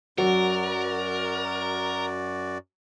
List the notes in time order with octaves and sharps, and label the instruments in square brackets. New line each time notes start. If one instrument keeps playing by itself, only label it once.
[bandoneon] F#2 F#4 D5 [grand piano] F#3 [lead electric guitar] A#4